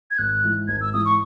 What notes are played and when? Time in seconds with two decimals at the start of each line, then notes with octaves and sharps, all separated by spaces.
0.11 G#6
0.18 G#1 F#6
0.44 G#2 E3
0.68 G#1 G#6
0.81 E6
0.93 G#2 E3 D#6
1.05 C#6